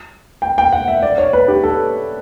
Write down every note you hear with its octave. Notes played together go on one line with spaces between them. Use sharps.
G5
G5
F#5
E5
D5
C#5
B4
G4
A4